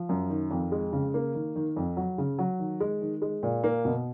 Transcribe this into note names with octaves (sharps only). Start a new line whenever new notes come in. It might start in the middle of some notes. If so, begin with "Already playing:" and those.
Already playing: F3
F#2
D#3
F2
G#3
C#3
A#3
D#3
D#3
F2
F#3
C#3
F#3
D#3
G#3
D#3
G#3
A#2
A#3
B2